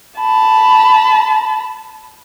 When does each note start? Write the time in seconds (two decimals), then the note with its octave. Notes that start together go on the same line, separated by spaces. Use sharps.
0.20 A5 B5